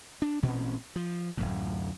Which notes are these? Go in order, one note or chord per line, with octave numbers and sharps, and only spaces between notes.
D4
A1 A#2 C4 C#4
F3
D1 G#1 F#2 A2